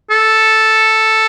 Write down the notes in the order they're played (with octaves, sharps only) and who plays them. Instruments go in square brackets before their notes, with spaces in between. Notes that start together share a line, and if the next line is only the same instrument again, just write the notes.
[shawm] A4